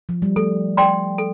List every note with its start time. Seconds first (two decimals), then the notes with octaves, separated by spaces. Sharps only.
0.09 F3
0.22 G3
0.36 A3 A4
0.77 D5 G5 C6
1.18 A4